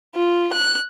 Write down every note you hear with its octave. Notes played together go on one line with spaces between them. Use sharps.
F4
F#6